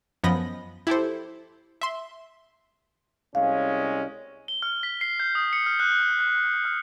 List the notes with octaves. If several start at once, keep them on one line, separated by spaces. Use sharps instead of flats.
F#2 F3 B3 D#5 B5 A#6
E4 G4 A4 C5
E5 C6
C2 G#3 C#4 F5
G7
F6
B6
C7
G6
D#6
C#7
F6
F#6
F#6
F6